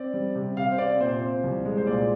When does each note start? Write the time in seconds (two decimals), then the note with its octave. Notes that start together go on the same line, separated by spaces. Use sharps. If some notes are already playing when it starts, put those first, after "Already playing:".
Already playing: C4 D5
0.14 G3
0.35 C3
0.57 C3 F5
0.72 C5
0.78 C4 D5
1.01 A#2 C5
1.20 C4 C5
1.43 C2
1.65 G#3
1.77 C5
1.87 A#2 D5